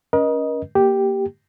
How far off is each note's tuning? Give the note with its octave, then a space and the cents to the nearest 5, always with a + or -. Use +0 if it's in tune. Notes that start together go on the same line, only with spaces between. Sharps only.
C#4 +15 A#4 +45 D#5 +0
A#3 +0 G4 +0